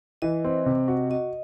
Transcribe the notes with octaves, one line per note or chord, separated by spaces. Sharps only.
E3 D#5
C4
C3
F#4
F#4 D#5